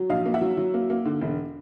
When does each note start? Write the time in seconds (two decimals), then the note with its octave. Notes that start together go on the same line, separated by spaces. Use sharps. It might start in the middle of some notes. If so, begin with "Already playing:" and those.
Already playing: F#3
0.09 A#1 D#5 F5
0.26 A#3
0.34 E5 F#5
0.41 F#3
0.57 F#3
0.74 A#3
0.90 A#3
1.05 D3
1.21 E1